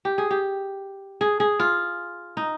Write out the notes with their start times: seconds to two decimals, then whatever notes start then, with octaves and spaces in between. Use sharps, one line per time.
0.05 G4
0.18 G#4
0.31 G4
1.21 G#4
1.40 G#4
1.60 F4
2.37 D#4